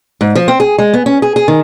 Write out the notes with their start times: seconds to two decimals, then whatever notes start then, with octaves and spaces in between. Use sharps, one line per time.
0.21 G#2
0.35 F3
0.48 C4
0.60 G#4
0.78 G#3
0.94 B3
1.06 C#4
1.22 G#4
1.36 G#4
1.48 D#3